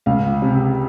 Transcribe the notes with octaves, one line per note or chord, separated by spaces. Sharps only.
C#2 F5
C3